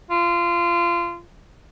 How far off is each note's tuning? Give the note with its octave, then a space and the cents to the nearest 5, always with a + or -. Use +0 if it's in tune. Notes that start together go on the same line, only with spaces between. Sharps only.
F4 -25